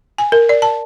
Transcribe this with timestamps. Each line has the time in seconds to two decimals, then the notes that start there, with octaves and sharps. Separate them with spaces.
0.18 G#5
0.32 A#4
0.49 D5
0.62 A5